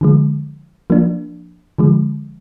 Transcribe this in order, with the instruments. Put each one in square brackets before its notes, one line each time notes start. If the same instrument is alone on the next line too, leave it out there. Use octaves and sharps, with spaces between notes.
[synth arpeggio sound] D3 F3 G#3
F3 A#3 D4
D3 F3 G#3